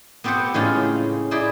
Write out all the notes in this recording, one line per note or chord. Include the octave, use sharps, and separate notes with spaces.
B3 C4 G4 A4 C5 F#5
A2 C#3 G#3 C#4 D#4 F4
D#4 E4 G#4 D5 E5